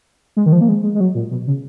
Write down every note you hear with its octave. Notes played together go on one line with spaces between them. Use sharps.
G#3
D#3
F3
A#3
G#3
G#3
G#3
F#3
A#2
B2
C#3